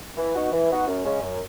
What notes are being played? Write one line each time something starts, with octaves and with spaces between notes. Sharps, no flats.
E3
B3 D#4 F#4
E3
B3 D#4 F#4
F#2
C#3 G#3 C#4
F#2